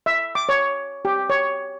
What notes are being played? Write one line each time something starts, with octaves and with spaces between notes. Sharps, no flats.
E5
D6
C#5
G4
C#5